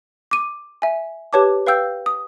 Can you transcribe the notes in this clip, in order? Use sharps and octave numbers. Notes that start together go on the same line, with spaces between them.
D6 D#7
E5 G#5
G4 B4 C#5 A5 D6
B4 F5 G5 E6 G6
D#6